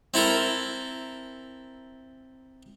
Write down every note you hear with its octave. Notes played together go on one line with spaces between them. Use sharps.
C4 E4 A4 A#4